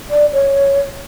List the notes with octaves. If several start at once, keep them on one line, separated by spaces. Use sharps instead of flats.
D5
C#5